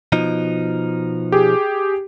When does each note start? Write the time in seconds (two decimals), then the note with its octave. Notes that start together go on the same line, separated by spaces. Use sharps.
0.12 B2 F3 D#4
1.32 G4 G#4